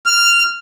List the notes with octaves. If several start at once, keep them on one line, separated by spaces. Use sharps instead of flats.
F6